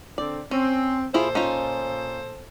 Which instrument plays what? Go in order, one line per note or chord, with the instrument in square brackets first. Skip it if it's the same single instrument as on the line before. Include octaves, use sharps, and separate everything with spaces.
[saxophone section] D3 C4 [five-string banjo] D5
[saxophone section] C4 [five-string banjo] C#4
[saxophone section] A#2 A4 C5 [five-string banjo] E4 F4 G#4
[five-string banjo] C#4 D#4 F4